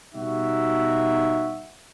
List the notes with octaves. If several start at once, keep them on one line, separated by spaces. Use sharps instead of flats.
B2 G3 D#4 F#4 E5